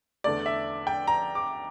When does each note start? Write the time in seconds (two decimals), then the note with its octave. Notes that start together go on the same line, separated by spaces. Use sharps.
0.24 E2 D3 A3 D5
0.46 E5
0.87 G5
1.07 A#5
1.35 D6